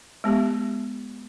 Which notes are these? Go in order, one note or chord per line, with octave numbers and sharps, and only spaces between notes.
G#3 B3 G4